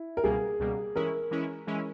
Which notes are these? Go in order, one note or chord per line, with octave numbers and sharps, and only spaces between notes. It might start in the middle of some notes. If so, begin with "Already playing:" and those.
Already playing: E4
A#4
C#2 B2 G3 A#3 G#4
C#2 B2 G3 A#3
E3 G#3 C#4 E4 A#4
E3 G#3 C#4 E4
E3 G#3 C#4 E4